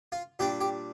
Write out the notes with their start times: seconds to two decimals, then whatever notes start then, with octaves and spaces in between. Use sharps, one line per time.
0.12 F4
0.39 A#2 G3 D4 G4
0.61 G4